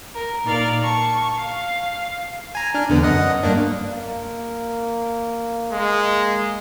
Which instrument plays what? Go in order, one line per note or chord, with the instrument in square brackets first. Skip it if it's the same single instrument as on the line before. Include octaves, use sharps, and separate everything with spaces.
[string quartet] A#4
A#2 D#4 A#4 D5 F5 F6
A5 C#6
F5
[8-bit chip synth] G#5 A#5
D4 F6
E2 D3 B3
F#2 D#5 F#5
G2 A#3 D4
[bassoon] A#3
[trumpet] G#3 [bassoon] A#3